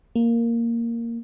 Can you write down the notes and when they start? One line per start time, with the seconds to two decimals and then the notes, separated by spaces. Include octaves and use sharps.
0.16 A#3